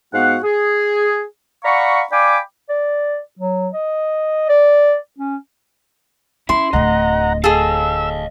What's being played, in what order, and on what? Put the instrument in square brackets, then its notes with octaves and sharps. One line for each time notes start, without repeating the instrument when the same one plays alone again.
[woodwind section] G#2 B3 F#4 F5 F#5
G#4
D5 F5 F#5 A#5 B5 C#6
D5 F5 G5 G#5 B5 D6
[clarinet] D5
F#3
D#5
D5
C#4
[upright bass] C#4 [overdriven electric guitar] E4 [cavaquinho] C6
[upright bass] D1 D2 [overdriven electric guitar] D#5 [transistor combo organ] F#5 A#5
[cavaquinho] G#4 A4 [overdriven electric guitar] D#5 F5 [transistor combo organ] E6